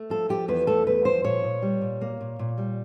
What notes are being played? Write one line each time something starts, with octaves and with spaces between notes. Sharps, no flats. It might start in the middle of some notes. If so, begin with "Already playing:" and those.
Already playing: A3
F3 A4
F3 G4
E2 B4
A3 A4
E2 B4
F3 C5
A#2 C#5
A#2
G3
A#2
A#3
A#2
A#2
G3